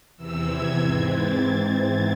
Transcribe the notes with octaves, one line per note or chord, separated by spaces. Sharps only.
E2 C3 E3 E6
G#6
G#2 E3 C4 G#6
A6